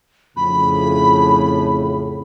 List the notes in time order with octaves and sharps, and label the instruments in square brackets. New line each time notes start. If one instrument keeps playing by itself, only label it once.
[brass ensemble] F2 A2 C#3 [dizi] B5